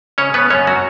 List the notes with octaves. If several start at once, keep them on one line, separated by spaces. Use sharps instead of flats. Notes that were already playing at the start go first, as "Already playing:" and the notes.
C#3 C#4 C#5
C#3 B3 B4
F#2 C#4 C#5
F#3 F#4